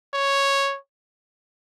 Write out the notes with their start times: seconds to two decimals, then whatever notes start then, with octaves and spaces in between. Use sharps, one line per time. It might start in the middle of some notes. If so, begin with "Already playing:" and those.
0.15 C#5